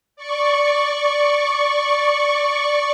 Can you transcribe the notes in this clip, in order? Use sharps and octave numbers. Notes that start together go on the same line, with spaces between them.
D5 C#6